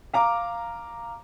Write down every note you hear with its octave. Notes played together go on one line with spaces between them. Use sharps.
F5 A#5 D6